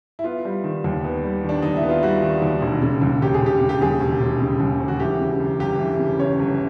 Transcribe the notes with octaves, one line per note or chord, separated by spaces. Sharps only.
E4
B3 F4
G3
D#3
D#2
B3
G3
D#3
D4
D#2 D#4
E4
B3
F4
G3 F#4
D#3
D#2
E1
C#3
D#2
E1 G4
G#4
E1 G4
C#3
G4
D#2 G#4
E1
E1
C#3
D#2
E1
F#4
E3 G4
C#3
F#2
G1 G4
E3
C#3
F#2 C#5
G1